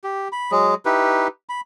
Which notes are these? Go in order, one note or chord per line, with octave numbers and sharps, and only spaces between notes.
G4
B5
F#3 G#3 G#4
D#4 E4 G4 B4
B5